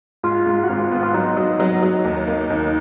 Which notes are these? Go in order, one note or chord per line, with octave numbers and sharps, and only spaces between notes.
G#2 F4
G#2
F#4
G#1 F4
B3
F4
F#3 D#4
F#3
F#3
F#3
D#2
A#3
D#2